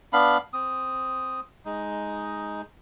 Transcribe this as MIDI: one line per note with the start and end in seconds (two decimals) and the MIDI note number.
0.13 0.37 59
0.13 0.37 62
0.13 0.37 77
0.13 0.37 83
0.53 1.40 60
0.53 1.40 87
1.65 2.62 56
1.65 2.62 63